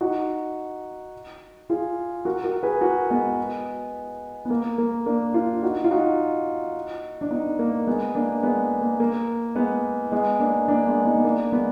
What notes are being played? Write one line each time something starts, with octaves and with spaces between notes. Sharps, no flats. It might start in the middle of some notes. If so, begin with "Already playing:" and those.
D#4 F#4
F4 G#4
F#4 A#4
F#4 A#4
G#4 B4
F#4 A#4
G#3 B3
B3
A#3
A#3
A#3 D4
D4 F4
D#4 F#4
F4
D#4 F#4
D4
B3 D#4
A#3
G#3 B3
A#3 D4
G#3 B3
A#3
A#3
G#3 B3
G#3 B3
A#3 D4
A#3 D4
G#3 B3
B3 D#4
B3
A#3 D4
G#3 B3